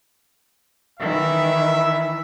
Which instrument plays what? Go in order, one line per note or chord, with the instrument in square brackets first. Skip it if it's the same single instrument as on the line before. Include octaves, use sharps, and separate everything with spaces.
[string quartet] D#3 E3 [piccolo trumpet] E5